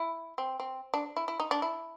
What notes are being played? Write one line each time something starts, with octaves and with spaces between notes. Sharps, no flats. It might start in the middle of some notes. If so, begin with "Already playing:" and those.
Already playing: E4
C4
C4
D4
E4
E4
D#4
D4
E4